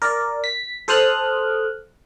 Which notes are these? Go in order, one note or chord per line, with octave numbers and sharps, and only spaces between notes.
A#4 D5
B6
A4 C5 D#6 F6 F#6